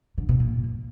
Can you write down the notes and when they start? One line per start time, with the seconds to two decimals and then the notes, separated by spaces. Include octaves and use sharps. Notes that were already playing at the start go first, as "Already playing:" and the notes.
0.18 D3
0.29 B2
0.40 A#2